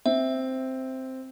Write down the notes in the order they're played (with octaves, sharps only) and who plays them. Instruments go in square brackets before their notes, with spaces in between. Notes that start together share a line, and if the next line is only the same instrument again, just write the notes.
[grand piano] C4 [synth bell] E5